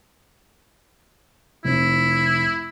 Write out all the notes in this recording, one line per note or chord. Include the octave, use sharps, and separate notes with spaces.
F1 E4